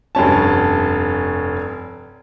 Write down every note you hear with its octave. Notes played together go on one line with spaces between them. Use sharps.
F1 G2 C#4 A5